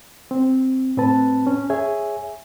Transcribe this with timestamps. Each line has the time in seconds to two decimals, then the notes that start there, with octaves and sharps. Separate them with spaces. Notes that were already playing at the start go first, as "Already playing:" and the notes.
0.31 C4
0.97 A2 C4 B4 A5
1.47 C#4
1.70 G#4 C#5 E5 G#5